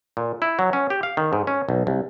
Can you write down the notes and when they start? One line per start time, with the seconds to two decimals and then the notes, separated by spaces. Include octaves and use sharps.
0.17 A#2
0.42 E4
0.59 F#3
0.73 C#4
0.90 G4
1.03 F5
1.17 D#3
1.33 G#2
1.47 C#4
1.69 B1
1.87 C2